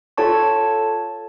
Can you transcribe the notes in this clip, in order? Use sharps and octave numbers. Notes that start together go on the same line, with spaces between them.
F4 A4 C#5 A5 C#6